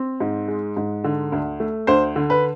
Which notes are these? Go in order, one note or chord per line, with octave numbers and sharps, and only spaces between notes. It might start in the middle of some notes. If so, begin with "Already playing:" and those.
Already playing: C4
G#2
G#3
G#2
D3
D2
A3
D2 C5
D3
B4